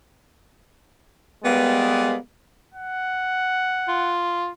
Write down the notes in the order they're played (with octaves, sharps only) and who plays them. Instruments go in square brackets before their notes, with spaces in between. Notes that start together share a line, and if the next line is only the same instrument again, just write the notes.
[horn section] G3 G#3 A#3 B3
[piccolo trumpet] F#5
[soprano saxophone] F4